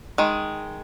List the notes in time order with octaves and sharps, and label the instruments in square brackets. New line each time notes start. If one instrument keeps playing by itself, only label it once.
[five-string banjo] D#3 G#3